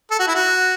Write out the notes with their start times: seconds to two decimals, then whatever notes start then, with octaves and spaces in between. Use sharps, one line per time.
0.11 A4
0.19 F#4
0.28 E4
0.35 F#4